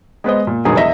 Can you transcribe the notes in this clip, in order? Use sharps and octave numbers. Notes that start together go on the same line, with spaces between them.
G#3 B3 C5 D#5
A#2
E1 A1 G2 D#3 F#3 G#4
E2 D#5 E5 A#6